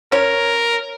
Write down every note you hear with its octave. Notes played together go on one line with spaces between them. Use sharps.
C#4 A#4 C#5